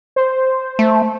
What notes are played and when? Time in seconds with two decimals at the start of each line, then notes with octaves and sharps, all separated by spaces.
0.16 C5
0.79 A3